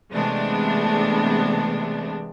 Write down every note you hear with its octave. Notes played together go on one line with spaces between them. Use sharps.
C3 E3 G#3 A3 B3 D4